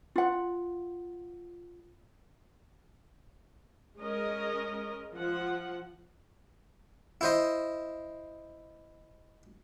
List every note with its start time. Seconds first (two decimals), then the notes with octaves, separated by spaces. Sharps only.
0.16 F4 F#5
3.97 G#3 C#4 A#4 D#5
5.16 F3 F#5
7.21 E4 C5 D#5